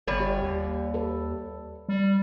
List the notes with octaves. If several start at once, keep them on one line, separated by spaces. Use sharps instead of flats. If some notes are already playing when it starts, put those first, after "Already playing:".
G1 G3 C#5 D5
G4
D#2
A4 B4
G3